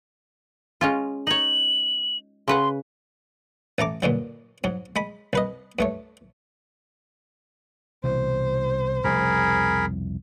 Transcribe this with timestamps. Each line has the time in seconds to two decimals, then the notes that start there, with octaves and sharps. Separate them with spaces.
0.81 G#3 C#4 F4
1.27 D#4 C#5 F#7
2.48 C#3 B4 F#5 C6
3.78 A1 A3 A#5 D6
4.02 G2 A#2 D3 F#3
4.64 G#2 F#3
4.96 G#3 B5
5.33 C2 B4 D#5
5.79 G2 A3 C#5
8.04 C2 B2 E3 C5
9.04 F1 C2 B2 G#4 A#4 B5